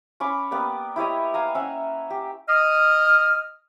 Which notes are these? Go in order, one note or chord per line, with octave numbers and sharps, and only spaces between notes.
C#4 B5 C#6 D6
A#3 B3 G4 D5
E4 G4 C#5 D#5
F5 G#5 A#5
C#4 E5 F#5
G4
D#5 D#6 F6